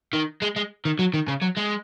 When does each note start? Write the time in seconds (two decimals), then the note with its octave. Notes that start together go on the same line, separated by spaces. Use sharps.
0.13 D#3
0.42 G#3
0.56 G#3
0.85 D#3
0.99 F#3
1.14 D#3
1.28 C#3
1.42 F#3
1.57 G#3